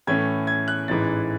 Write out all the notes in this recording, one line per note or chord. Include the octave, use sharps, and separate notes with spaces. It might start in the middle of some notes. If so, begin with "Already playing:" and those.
A2 E3 A3 C#4 G#6
G#6
F#6
A1 G#2 E3 A6